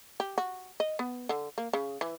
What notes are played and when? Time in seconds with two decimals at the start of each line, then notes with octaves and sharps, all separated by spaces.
0.20 G4
0.38 F#4
0.80 D#5
0.99 B3
1.29 D3
1.58 A#3
1.73 C#3
2.01 E3